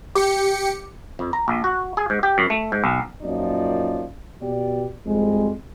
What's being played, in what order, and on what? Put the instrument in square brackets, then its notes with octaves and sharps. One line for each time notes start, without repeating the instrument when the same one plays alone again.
[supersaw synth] G4 C#7 [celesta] D6
[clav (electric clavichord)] F2
A#5
A#1
F#4
G#4
G#2
G4
F#2
A3
G#2
B1
[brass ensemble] F#2 A#2 F3 D#4 D5
B2 G4 D5
G#1 F2 G3 G#3